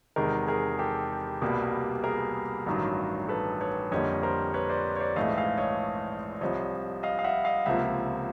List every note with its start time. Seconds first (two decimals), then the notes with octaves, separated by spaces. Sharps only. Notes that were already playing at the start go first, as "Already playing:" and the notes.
0.16 E2 C3 D#3 G#3 G#4 A#4
0.48 G#4 A#4
0.79 G4 A4
1.42 C2 B2 G3 A#3
2.04 G#4 A#4
2.66 A1 G2 D#3 F#3
3.28 A4 B4
3.61 B4 C#5
3.91 F2 D3 G3 A#3 C#5 D#5
4.23 A#4 C5
4.54 B4 C#5
4.69 C5 D5
4.96 C#5
5.00 C5 D5
5.16 A#1 G#2 E3 A3 D#5 F5
5.37 D#5 F5
5.58 C#5 D#5
6.41 C2 C3 F3 C#5 D#5
7.03 D#5 F5
7.19 F5
7.24 E5 F#5
7.45 D#5 F5
7.66 C#2 C3 F3 A#3 E5 F#5